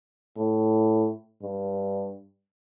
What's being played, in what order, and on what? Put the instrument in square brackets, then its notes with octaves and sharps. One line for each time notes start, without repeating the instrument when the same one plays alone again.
[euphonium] A2
G2